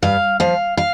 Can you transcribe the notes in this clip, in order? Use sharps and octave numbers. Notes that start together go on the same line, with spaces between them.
G2 F5
F3 F5
F5